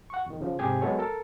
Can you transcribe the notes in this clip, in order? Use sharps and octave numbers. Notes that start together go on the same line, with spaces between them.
F#5 C#6
E2 D#3
C#3 F3
G#2 C3 G4 G#4 G#5 G#6
F#3 G#3 B3 A4 C#5
A4 A#4